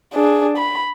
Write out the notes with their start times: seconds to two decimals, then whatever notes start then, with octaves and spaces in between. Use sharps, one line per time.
0.14 D4 G#4
0.57 B5